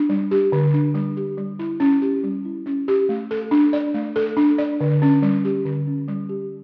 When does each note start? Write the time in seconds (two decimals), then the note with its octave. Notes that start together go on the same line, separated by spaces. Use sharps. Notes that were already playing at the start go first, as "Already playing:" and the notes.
Already playing: D4
0.09 G3
0.31 G4
0.52 D3
0.74 D4
0.95 G3
1.17 G4
1.37 G3
1.59 E4
1.80 C#4
2.02 G4
2.24 G3
2.45 E4
2.66 C#4
2.88 G4
3.09 A3
3.31 A4
3.51 D4
3.73 D5
3.94 A3
4.16 A4
4.37 D4
4.58 D5
4.81 D3
5.02 C#4
5.22 G3
5.45 G4
5.65 D3
5.87 C#4
6.08 G3
6.29 G4